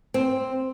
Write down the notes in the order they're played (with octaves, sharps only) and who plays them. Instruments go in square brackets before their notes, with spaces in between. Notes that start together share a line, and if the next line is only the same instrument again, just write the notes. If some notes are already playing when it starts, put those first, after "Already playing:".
[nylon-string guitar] C4